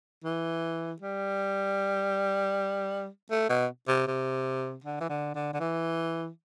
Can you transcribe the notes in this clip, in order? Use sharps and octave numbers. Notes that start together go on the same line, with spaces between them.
E3
G3
A3
B2
C3
C3
D3
E3
D3
D3
D3
E3